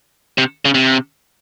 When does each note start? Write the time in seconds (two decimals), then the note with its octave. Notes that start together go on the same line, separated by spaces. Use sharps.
0.38 C3
0.65 C#3
0.74 C3